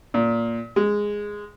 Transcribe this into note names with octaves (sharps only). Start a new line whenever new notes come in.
A#2
G#3